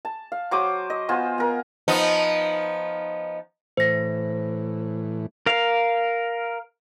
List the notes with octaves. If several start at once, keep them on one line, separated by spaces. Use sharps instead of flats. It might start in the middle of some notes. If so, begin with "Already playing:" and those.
A5
F5
F#3 C5 D6 D#6
D#5
B3 F4 C5 G#5
B3 A#4
F3 B3 D#4
A2 E3 C5 A#6
A#4 F5